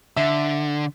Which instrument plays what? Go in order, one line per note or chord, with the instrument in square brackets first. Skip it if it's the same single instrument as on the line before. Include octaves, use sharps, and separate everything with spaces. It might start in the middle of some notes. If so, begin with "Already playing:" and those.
[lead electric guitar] D3 [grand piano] E5